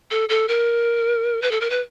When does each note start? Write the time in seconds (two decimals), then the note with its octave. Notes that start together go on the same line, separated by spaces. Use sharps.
0.11 A4
0.29 A4
0.48 A#4
1.42 B4
1.51 A4
1.61 A#4
1.70 B4